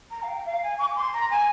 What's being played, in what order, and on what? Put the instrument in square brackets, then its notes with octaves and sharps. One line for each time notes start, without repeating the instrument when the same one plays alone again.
[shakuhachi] A#5
F5
G5
F5
G#5
D6
C6
A#5
G#5